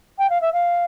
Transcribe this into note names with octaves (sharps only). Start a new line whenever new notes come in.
G5
F5
E5
F5